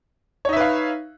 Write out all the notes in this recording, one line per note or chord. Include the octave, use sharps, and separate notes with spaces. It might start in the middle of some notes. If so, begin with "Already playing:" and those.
D#4 B4 C#5 E5 F5